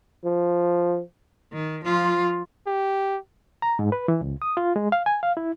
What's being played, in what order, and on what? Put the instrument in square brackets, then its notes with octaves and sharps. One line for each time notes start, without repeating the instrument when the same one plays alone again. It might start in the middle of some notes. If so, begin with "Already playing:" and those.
[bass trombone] F3
[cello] D#3
F3 F4
[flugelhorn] G4
[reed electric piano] A#5
G#2
B4
E3
C#2
D#6
F4
G#3
F5
G#5
F5
E4